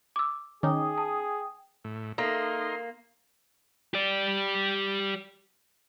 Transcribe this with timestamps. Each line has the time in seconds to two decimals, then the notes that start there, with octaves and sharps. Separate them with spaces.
0.16 D6 E6
0.63 D#3 C#4 D#4 G#4 G5 D6 D#6
0.98 A5
1.84 A2
2.18 A#3 D#4 A4 E5 C6
3.94 G4 D5